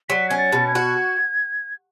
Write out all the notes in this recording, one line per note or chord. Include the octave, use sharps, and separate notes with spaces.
F#3 B6
C#4 G#6
A6
B2
G#6
F#4